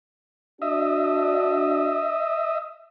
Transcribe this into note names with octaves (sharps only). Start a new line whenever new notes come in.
D4 F#4 D#5 E5